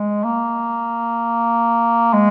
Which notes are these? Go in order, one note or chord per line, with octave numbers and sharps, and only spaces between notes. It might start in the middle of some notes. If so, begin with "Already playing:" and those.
Already playing: G#3
A#3
G#3